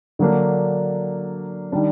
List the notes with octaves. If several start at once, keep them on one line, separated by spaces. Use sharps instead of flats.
D3 F#3 A#3 D4
D#3 G3 D4